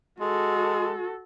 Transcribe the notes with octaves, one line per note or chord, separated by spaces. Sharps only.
G#3 F#4 A4